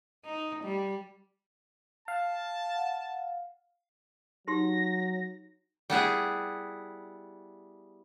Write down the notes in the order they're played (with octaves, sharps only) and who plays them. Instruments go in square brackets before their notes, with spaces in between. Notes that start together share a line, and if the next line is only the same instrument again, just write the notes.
[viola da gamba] D#4
G3
[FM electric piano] F5 [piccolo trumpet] A5
[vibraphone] F#5
[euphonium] F#3 [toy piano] D#4 G4 C6 [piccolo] A#6
[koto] G3 B3 E4 G#4